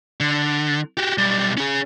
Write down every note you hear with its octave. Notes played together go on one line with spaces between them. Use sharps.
D3
F#4 G4
B1 G3
C#4 G#4